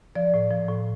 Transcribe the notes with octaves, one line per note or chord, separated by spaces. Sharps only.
F3 D5
A2
F3
A2